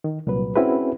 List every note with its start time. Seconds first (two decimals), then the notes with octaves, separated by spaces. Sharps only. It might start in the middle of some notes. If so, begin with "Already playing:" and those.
0.04 D#3
0.27 C2 A#2 F#3 B4
0.55 C4 C#4 E4 F#4 G#4 B4